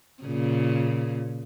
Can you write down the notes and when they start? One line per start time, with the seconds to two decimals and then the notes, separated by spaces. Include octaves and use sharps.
0.23 A#2 C#3